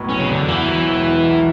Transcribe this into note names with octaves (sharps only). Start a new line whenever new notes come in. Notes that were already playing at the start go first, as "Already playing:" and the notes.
Already playing: B1 A2 B3
F#3 C#4
C#3
E2 D3
E2 E3
F#3
E1
E4
B1